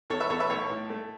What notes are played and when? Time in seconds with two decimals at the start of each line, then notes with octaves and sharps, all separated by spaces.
0.10 E2 A4 C#5
0.20 B4 E5
0.30 E2 A4 C#5
0.40 B4 E5
0.50 B1 A4 C#5
0.70 A2
0.90 A3